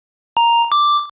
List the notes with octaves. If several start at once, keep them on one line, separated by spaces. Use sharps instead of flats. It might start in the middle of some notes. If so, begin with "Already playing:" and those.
A#5
D6